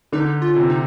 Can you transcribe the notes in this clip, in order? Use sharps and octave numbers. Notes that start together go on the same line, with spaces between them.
D3 D#4
F4
C3
D#4